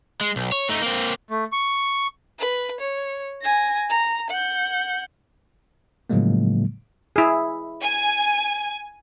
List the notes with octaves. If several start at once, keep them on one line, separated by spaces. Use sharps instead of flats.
G#3
B1
C#5
A3 D#4
A#3 C4
A3
C#6
B4
C#5
G#5 A#6
A#5
F#5 G6
A2 C#3 F3 F#3 G#3 A#3
E4 G#4
G#5